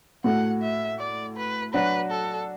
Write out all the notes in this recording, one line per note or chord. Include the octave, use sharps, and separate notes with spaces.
A2 A3 F#4 F#5
E5
D5
B4
F#3 D4 F#4 B4
A4